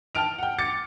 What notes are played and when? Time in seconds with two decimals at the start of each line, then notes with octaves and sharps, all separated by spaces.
0.15 G5 A5 F6 D7 F7
0.38 F#5 G5
0.58 D6 A6 C#7